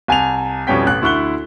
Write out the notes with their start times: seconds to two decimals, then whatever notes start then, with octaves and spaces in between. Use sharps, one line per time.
0.08 C2 G#5 A5 F7
0.67 F2 B2 G3 C#4 G5 B6
0.87 A1 F#6
1.02 D2 E4 C#6 F#6 G7